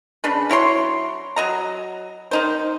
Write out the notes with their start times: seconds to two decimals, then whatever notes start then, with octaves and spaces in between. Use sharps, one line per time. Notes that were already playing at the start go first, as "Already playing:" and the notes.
0.24 C#3 D4 B4
0.49 F#3 E4 C#5 C6
1.36 F#3 D#5 A#5
2.31 D#3 D#4 C5